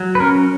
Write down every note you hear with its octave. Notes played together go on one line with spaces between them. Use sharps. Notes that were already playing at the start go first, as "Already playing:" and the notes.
Already playing: F#3
B4
C#4 A#4